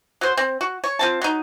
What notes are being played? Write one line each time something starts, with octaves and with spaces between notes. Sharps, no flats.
F#3 C5
C4
F#4
C#5
F3 C4 A5
F#3 D#4